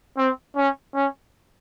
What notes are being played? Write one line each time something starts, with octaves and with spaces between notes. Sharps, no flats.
C4
C#4
C#4